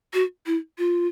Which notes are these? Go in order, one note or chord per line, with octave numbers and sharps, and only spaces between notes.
F#4
E4
F4